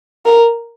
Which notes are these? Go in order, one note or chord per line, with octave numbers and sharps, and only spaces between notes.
A#4